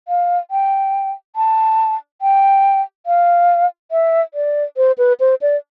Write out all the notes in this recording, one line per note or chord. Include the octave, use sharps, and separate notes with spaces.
F5
G5
A5
G5
F5
E5
D5
C5
B4
C5
D5